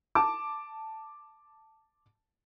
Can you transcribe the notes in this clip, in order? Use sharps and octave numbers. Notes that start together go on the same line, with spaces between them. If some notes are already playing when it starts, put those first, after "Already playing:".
A5 D6